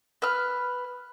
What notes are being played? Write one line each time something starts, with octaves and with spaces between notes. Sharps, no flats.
B4 F6